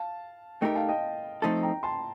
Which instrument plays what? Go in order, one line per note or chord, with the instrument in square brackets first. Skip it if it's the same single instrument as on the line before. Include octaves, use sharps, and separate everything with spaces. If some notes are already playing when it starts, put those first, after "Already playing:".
Already playing: [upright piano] F5 A5
[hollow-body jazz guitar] A3 D#4 G4 A#4 [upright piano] D#5 G5
[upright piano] F5 A5
D#5 G5
[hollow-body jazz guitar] F3 A3 C4 D#4 A4
[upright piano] G5 A#5
A5 C6